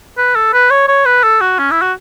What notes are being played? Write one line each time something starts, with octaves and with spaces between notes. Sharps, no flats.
B4
A4
B4
C#5
C#5
B4
A4
F#4
C#4
E4
F#4